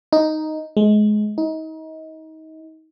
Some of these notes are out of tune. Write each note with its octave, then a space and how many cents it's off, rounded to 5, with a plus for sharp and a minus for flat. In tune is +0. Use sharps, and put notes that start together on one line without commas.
D#4 +0
G#3 +25
D#4 +30